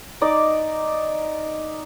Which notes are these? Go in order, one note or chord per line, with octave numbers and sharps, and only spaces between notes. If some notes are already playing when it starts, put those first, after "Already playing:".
D#4 D5 D6